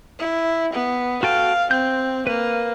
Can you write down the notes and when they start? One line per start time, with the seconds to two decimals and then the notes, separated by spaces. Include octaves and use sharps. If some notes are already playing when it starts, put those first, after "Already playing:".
0.19 E4
0.73 B3
1.23 F#4 A4 F5 G5
1.71 C4 G6
2.27 A#3 B4